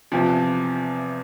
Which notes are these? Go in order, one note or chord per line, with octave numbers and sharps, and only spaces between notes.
E2 C3 F3